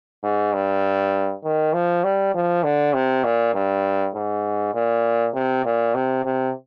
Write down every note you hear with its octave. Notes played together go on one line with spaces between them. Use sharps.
G#2
G2
D#3
F3
G3
F3
D3
C3
A#2
G2
G#2
A#2
C3
A#2
C3
C3